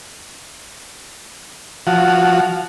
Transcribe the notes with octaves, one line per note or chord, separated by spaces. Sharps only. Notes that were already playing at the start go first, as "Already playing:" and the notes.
F3 F#4